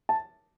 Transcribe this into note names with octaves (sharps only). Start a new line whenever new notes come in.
A5